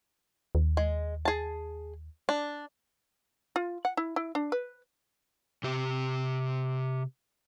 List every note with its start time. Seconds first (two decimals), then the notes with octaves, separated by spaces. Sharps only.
0.55 D#2
0.77 G#3
1.25 G#4 A5
2.29 D4
3.56 F4
3.85 F#5
3.97 E4
4.16 E4
4.35 D4
4.52 B4
5.63 C3 G4